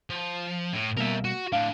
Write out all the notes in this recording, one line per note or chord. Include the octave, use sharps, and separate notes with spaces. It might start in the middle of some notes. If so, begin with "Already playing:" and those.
F3
A2
B2 G3 A#3 A#4 E5
F#4
A2 D4 F5